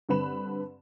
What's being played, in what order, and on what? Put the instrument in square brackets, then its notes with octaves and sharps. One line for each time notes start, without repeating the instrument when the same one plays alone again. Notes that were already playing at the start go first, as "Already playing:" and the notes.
[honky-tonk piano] G2 D3 C4 B4 B5 E7